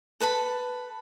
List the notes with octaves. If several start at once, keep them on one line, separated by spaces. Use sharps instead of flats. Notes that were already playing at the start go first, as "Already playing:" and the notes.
A4 B4 A5 B5